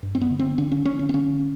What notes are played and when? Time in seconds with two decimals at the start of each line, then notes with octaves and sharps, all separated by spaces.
0.03 G2
0.15 C4
0.21 B3
0.30 D3
0.39 C4
0.58 D3 D4
0.72 C#4
0.85 D3 C#4
0.99 C#4
1.09 C4
1.14 D3 C#4